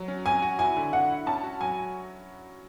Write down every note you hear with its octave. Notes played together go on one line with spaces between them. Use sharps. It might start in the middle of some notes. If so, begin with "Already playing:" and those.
Already playing: F#3
C#4
C#4 G#5
F#4
E4 G#5
D3
D3 F#5
E4
C#4 A5
F#4
F#3 G#5